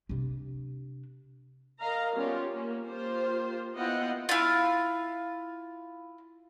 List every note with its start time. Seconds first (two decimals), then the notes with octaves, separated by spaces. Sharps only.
0.09 C3 D4
1.79 A#4 D#5 F5 A#5
2.15 G3 B3 C#4 F4 G4
2.49 A#3 C#4
2.87 A#3 F4 G4 C5
3.76 B3 E4 F4 D#5 F#5 G5
4.29 E4 F4